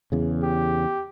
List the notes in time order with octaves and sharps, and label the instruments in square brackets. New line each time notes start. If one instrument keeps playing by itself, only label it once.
[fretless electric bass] E2 C#3
[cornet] G4